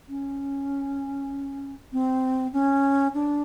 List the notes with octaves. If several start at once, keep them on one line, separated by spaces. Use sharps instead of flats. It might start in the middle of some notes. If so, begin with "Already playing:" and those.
C#4
C4
C#4
D4